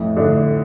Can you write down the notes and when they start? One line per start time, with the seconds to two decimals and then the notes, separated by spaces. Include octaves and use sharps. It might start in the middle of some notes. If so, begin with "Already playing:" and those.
Already playing: F2 A2
0.17 A2 D3 D4